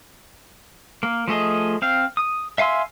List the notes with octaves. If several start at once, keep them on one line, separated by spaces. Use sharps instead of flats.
A#3
F3 A3 G#4 D#5
C4 F5
D#6
E5 F5 G#5 C6 E6